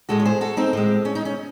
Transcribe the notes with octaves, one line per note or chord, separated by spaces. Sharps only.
A2 G#3 F#4 A4
C#5
G#4 C5
F#4 A4
C4 D#4
A2 G#3 C4
C#4
D#4
C#4